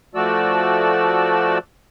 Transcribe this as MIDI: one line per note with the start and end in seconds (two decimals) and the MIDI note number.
0.15 1.58 53
0.15 1.58 57
0.15 1.58 66
0.15 1.58 69
0.15 1.58 74
0.15 1.58 88